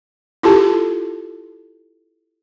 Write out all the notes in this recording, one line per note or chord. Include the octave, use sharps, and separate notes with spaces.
E4 F4 G4 A4 A5